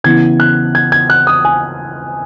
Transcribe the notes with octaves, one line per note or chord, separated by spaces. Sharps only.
C#3 E3 B3 E4 G#6
F#6
G#6
G#6
F#6
D#6
G#5